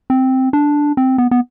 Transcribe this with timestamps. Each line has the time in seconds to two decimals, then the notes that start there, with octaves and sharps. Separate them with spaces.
0.10 C4
0.53 D4
0.97 C4
1.18 B3
1.31 B3